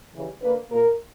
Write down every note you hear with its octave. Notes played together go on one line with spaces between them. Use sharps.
C#3 E3 G3
D3 A#3 B4
A#2 A#3 A#4